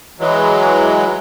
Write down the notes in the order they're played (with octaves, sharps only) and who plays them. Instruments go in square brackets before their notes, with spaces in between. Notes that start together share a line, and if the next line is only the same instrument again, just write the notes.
[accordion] E3 F#3 G#3